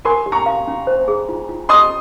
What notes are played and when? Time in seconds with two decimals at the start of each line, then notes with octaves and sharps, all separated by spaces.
0.05 A#4 G#5 C6
0.26 G4
0.32 A#5 C#6
0.46 F5
0.67 C#4
0.87 C5
1.08 G#4
1.29 F4
1.49 F4
1.69 D#5 C6 D#6